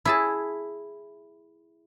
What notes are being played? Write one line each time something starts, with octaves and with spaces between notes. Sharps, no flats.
E4 G#4 A5